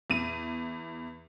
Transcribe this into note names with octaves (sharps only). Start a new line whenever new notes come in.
E2 D#7